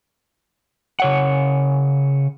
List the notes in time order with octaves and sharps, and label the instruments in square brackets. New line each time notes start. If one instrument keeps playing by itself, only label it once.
[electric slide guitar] C#3 C#5 F#5